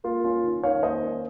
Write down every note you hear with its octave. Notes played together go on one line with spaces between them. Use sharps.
A#3 F4
C#4 F4
D#3
D#3 C#5 F5
A#3 C5 D#5
C#4